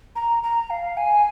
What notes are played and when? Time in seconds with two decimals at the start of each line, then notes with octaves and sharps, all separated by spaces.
0.16 A#5
0.43 A#5
0.70 F5
0.97 G#5